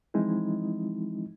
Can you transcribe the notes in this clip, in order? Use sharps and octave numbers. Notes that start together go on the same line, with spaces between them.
E3 F3 G#3 C4 D#4 E4